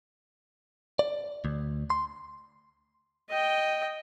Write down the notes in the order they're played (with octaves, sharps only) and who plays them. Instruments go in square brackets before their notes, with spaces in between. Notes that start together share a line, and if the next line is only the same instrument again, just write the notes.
[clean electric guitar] D5
D2
C6
[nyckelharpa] D#5 G5